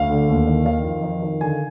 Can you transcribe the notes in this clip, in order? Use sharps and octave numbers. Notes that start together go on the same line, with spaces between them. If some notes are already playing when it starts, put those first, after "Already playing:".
Already playing: D2 F5
D3
D#2
D#3
D#3 F5
F2
D#3
D#3
D3 G#5